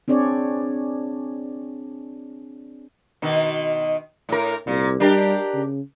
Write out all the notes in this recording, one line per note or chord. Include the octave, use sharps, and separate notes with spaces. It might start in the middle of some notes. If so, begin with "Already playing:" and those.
C4 D4 G#4 C#5 D5
B2 D#3
A2 A#4
C2 A#2
G3 D4 G4 A#4
C#3